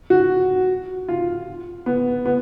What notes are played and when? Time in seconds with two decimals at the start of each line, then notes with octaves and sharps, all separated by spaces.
0.10 F#4
1.08 F4
1.86 B3
2.26 B3